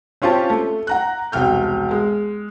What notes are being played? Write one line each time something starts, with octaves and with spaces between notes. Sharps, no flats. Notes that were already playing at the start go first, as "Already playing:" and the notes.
C4 C#4 F4 G4 A5
A3
F#5 A#5 F#6
E1 C2 G5 F6 G6
G#3